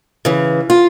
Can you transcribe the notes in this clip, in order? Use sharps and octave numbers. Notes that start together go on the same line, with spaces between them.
C#3 E3
F4